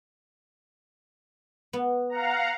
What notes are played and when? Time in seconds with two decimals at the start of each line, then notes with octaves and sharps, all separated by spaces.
1.73 B3
2.10 F5 F#5 A#5